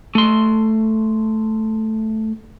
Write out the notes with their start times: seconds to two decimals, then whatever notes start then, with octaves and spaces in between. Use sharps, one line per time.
0.15 A3 C6